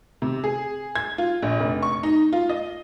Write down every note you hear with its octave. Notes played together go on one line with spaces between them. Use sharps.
C3
G#4
G#6
F4
A#1
F1
C#6
D#4
F4
D#5